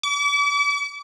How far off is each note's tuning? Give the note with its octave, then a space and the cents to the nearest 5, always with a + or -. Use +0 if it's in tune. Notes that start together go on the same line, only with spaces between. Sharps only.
D6 -40